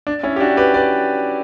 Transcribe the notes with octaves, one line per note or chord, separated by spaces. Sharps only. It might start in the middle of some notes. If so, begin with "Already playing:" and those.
D4
C#4 E4
G4
D4 F#4
G4 B4
B4 D5